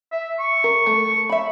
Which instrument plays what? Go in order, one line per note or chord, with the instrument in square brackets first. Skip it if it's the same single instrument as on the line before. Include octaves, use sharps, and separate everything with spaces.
[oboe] E5
C#6
[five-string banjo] A#4
A3
E5 B5